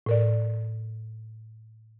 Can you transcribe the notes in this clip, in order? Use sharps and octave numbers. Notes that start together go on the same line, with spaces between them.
A2 A#4 D5